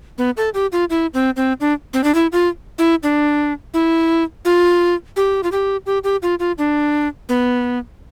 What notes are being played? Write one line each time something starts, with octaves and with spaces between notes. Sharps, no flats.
B3
A4
G4
F4
E4
C4
C4
D4
C4
D4
E4
F4
E4
D4
E4
F4
G4
F4
G4
G4
G4
F4
F4
D4
B3